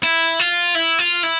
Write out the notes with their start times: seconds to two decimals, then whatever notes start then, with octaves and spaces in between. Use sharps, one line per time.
0.03 E4
0.40 F4
0.75 E4
0.99 F4
1.24 E4